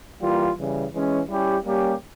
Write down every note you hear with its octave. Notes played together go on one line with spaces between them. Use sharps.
E3 G3 A#3 F4
C#3 E3 G3
E3 G#3 C#4
G3 C#4 E4 G4
G3 A#3 C#4 G4